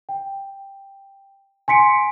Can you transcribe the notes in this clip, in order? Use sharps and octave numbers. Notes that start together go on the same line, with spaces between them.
G5
G#5 C6 B6 C#7 D7